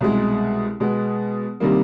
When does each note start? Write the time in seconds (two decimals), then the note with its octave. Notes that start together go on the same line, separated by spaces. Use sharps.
0.01 C2 B2 G#3
0.80 B2 G#3 B3
1.60 C3 D#3 G3 A#3